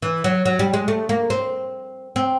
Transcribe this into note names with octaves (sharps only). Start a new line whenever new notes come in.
E3
F#3
F#3
G3
G#3
A3
A#3
C4
C4